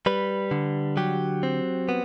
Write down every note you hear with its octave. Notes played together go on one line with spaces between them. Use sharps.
G3 B4
D3
F#3 G4
C4
B3